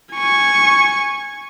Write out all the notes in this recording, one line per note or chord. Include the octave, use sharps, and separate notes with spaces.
G#5 C#6